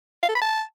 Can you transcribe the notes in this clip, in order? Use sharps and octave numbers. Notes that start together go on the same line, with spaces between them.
F5
A4
B5
A5